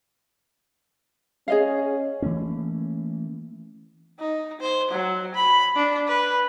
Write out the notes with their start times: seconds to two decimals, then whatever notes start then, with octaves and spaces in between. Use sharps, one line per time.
1.48 C#4 G#4 D#5 F5
2.22 E3 A3 A#3 C#4
4.19 D#4
4.61 C5
4.91 F#3
5.35 B5
5.76 D4
6.07 B4